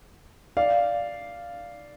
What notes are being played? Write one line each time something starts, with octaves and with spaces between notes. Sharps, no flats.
D5 F5